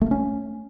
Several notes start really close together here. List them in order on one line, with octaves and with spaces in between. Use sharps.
A3 A#3 C#4